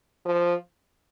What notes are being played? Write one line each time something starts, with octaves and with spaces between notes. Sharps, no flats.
F3